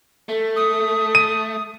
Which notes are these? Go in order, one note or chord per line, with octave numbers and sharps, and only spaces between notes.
A3 A4
D#6
D#7